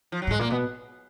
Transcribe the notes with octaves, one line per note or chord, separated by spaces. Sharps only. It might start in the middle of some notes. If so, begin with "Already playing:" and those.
F3
F#3
G#2 G#3
A#2 A#3
B2 B3